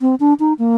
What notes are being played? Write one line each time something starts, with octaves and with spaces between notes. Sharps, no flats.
C4
D4
D#4
A#3